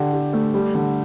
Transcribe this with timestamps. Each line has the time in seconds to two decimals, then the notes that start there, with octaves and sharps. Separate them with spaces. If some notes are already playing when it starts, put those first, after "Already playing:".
Already playing: D3 G4
0.13 G4
0.33 A3
0.54 G3
0.74 D3